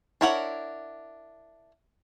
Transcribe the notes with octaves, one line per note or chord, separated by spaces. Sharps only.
D4 E4 A#4 C#5 F#5